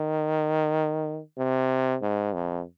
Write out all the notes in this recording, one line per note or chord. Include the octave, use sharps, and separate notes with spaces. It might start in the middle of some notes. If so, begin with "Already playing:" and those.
Already playing: D#3
C3
G#2
F2